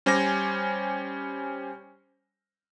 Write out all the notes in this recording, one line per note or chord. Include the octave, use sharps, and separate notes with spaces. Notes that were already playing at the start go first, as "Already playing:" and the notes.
G3 C#4 C5 G#5 D6 A#6